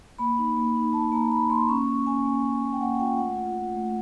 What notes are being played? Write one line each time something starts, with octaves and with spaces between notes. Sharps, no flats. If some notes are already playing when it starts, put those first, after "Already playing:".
A#3 B5
D#4
A#3
D#4
A#3 A5
A#3 A#5
A#3 B5
A#3 C6
C#4 C#6
C#4 C#6
C#4 G#5
A#3
C#4
A#3
G5
A#3 F#5
F4 G5
A3 F#5
F4
F4
A3